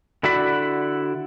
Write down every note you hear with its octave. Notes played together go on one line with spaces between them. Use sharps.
D3 E4 F#4 D5 B5